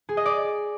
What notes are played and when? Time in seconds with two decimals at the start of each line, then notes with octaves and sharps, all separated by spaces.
0.09 G#4
0.17 D#5
0.26 D5